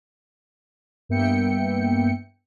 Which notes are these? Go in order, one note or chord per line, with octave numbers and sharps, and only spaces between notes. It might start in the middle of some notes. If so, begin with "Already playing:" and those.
G2 A#3 B3 E5 G5 C#7